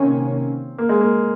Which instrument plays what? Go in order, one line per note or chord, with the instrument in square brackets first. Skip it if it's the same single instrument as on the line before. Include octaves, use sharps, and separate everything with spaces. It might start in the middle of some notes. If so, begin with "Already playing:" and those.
Already playing: [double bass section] C3 D#3 A#3 C#4 [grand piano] C4
[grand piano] A#3
G#3
A#3